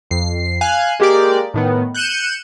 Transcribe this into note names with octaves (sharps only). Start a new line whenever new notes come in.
F2 C7
F5 G#5 F#6
G#3 A#3 G4 A#4 D5
A2 D#3 B3
F#6 G6 C#7 D#7 E7